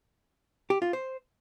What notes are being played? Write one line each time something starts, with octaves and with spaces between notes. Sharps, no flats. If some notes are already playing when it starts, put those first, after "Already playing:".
G4
F4
C5